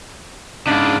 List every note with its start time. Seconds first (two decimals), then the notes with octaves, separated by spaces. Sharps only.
0.67 G#2 C#3 D4